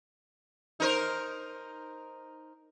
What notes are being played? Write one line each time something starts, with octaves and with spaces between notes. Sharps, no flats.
D#4 A#4 C5